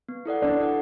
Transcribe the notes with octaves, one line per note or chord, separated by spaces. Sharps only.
B3
E4 A4 D5 F#5
B3 D4
E4 A4 D5 F#5